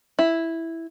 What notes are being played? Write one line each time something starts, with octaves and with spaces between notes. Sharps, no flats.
E4